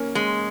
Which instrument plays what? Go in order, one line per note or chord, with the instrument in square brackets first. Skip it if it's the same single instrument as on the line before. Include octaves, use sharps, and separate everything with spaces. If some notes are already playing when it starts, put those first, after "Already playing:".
Already playing: [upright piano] A#3 C#4
[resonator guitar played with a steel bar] G#3